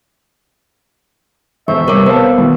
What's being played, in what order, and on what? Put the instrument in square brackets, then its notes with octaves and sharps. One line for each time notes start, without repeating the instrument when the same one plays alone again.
[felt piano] E1 [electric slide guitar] A4 C5 D#5 [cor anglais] E5 [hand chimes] C#6
[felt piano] C3 D6 [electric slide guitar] G3 A3 [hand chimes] A#4 B4 C#5
[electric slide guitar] B3 C4 [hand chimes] B4 [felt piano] C5 F5 A5
[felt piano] B2 [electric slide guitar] D#3 E4